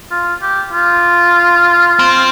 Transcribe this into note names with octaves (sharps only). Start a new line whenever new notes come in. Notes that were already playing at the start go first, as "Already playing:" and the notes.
F4
G4
F4
C4